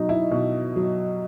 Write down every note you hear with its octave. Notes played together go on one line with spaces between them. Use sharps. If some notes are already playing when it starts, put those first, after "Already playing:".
Already playing: B2 F#3 D#4
E4
B2
F#3